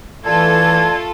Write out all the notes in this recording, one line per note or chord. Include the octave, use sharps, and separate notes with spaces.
E3 A3 F4 A4 D5 A5 G#6